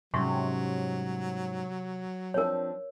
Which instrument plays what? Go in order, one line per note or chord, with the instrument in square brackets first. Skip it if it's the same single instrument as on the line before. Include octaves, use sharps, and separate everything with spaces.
[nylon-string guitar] G#2 G3 C#4 [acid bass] C3 [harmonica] F#3 [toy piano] C6 C#6
[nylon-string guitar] F3 C4 D4 [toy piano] A#4 C#5